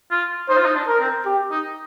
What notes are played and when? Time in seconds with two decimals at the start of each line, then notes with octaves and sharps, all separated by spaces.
0.11 F4
0.49 D#4 C5
0.57 F4
0.65 D#4
0.75 D4
0.88 A#4
1.00 C4
1.26 G4
1.51 D#4